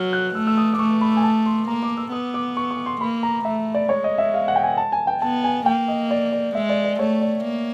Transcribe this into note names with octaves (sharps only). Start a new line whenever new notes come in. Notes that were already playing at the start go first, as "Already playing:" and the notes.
Already playing: F#3 F6
F#6
A3 E6
E6
D#6
D6
A3 C#6
B5
G#5
A5
C6
A#3 A#5
D6
E6
B3 D#6
D6
C#6
C#6
C6
A#3 B5
A#5
A3 E5
D5
G#3 C#5
D#5
E5
F5
F#5
G5
G#5
A5
G#5
G5
B3 A5
G#5
A#3 G5
D#5
D5
D5
G#3 E5
D5
D5
A3 C#5
D5
A#3